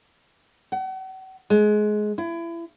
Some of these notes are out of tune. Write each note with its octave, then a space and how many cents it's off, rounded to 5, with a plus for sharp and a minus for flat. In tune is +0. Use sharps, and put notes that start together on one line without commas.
F#5 +40
G#3 +20
E4 +30